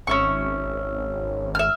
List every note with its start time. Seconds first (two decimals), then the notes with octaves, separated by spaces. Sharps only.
0.07 G#1 C#4 E5 C#6
1.55 E5 F6